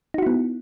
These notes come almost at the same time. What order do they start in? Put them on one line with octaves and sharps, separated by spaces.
D#4 F#4 E4 B3